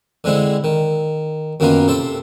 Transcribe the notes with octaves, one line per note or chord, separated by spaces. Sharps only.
D3 G#3 C4 E4
D#3
F#2 D#3 A#3 B3 D#4 F4
C3 A4 C5 G5